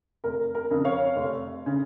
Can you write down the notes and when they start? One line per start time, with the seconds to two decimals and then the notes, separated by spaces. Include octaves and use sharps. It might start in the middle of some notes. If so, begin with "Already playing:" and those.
0.24 F1 A#4
0.55 A#4
0.71 F2 C#3
0.85 C#5 F5
1.16 F1
1.66 C#3